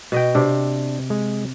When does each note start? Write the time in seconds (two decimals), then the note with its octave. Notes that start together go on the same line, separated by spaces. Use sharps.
0.12 B2 D#5 G5
0.35 C3 D4
1.10 G#3